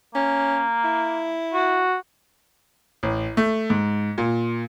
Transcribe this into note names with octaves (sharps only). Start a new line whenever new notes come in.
A#3 C#4
E4
F#4
A1
A3
G#2
A#2